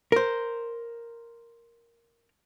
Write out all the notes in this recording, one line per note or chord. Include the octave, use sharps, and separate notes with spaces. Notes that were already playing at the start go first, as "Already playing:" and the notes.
A#4 C5